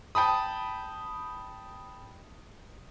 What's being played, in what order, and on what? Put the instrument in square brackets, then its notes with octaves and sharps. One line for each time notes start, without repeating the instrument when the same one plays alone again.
[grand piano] G5 A5 B5 D#6